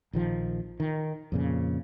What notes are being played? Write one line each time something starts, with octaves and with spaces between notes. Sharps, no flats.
A#1 D#3 F3
D#3
F2 A#2 C#3